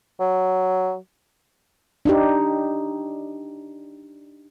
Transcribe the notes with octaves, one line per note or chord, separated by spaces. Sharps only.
F#3
D4 D#4 G4